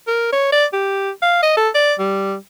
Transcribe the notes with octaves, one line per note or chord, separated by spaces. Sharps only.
A#4
C#5
D5
G4
F5
D#5
A4
D5
G3